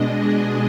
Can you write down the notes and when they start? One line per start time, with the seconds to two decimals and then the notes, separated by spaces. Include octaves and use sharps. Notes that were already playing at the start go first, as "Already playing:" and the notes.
Already playing: B2 G#3 D4 D#5
0.17 G#4